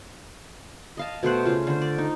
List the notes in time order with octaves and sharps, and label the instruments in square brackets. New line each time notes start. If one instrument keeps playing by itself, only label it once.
[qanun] D#5 F5 A5
B2 A3 C5 F#5
C#3 F4
D3 C5
D5
D#4